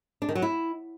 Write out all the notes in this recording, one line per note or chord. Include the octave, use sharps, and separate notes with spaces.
D4
D#3
F#3
E4